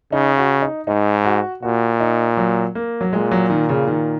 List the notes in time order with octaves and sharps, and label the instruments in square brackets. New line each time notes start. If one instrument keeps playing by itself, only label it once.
[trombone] C#3 [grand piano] D#4
[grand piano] F#4
D#4
[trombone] G#2 [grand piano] D#4
[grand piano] F#4
[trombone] A#2 [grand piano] F#4
[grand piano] D#4
F#3
A#3
F#3
[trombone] A#2 [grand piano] G#3
[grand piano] F#3
D#3
C#3
D#3